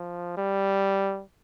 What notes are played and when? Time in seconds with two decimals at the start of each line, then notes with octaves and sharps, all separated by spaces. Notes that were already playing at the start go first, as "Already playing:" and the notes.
Already playing: F3
0.37 G3